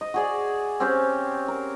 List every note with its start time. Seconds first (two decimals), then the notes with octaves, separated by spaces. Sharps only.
0.01 D#5
0.14 F#4 G#4 D5
0.80 C4 C#4 G4 C5
1.48 A#4